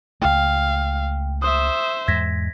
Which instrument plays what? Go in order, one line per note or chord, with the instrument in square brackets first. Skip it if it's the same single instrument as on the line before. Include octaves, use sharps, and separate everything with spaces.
[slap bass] C#2 A3 [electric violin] F5 [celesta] G5
[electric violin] C5 E5 [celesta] D#6
[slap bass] E2 G#2 G#3 [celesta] G#6 A#6 B6